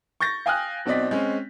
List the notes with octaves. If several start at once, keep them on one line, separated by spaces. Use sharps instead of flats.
C#6 G6 A6 A#6
F5 G5 G#5 D#6 F6 F#6
B1 B2 C4 D5 D#5 B6
G#3 C4 C#4